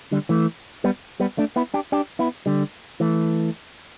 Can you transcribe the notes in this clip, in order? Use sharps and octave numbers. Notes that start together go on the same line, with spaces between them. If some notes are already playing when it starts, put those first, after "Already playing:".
D3 G3
E3 A3
G3 B3
G3 B3
A3 D4
B3 E4
D4 G4
D4 G4
B3 E4
D3 G3
E3 A3